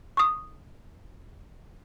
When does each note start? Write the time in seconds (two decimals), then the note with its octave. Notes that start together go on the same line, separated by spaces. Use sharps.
0.17 C#6 D#6